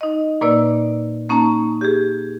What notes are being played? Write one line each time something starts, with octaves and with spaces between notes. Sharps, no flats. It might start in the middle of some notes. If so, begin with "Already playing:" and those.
D#4 D#5
A#2 A#3 D#4 B4 D5 E6
A#3 C#4 D#4 A5 A#5
G4 G#4